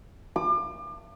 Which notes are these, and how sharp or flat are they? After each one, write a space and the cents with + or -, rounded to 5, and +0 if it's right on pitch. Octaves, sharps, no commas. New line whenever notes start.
D6 +35